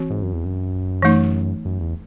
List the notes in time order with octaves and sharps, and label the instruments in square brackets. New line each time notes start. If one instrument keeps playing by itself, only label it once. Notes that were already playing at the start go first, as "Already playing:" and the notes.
Already playing: [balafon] E3 C4 F#4
[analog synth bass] G#2
F#2
E2
F#2
[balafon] E3 A3 D#4
[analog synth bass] F#2
E2